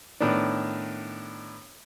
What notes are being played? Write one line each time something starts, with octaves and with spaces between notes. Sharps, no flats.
A2 D#3 B3 D4